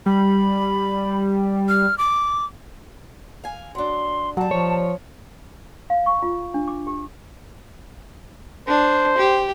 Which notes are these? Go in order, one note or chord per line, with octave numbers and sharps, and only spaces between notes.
G3 B5
F6
D6
F5 G#5
F#3 D4 C6
A#2 F#3 G3 A5
F3 C#5
F5
C#6
F4
D4
D6
G4
D4 C5
G4